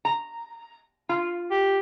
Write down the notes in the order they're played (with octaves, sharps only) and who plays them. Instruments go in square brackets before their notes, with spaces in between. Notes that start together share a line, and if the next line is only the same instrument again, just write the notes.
[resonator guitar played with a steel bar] A#5
F4
[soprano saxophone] G4